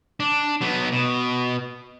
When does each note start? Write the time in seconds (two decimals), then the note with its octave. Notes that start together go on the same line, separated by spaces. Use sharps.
0.20 D4
0.61 F#3 B3
0.92 B2